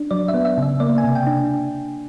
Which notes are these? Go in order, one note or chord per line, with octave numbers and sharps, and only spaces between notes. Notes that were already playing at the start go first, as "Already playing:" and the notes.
Already playing: D4
F#3 D5
E5
B3
E5
C#3 E5
A#3 D5
G#5
C3
G5
D4